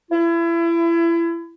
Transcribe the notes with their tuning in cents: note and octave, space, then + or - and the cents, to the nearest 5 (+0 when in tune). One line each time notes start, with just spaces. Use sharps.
E4 +30